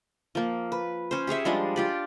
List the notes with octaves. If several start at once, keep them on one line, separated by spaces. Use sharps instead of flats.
F3 A#3
B4
C#4 C5
G4 G#4 C#5 E5
F3 G3 G#3 D4
F4 G4 D5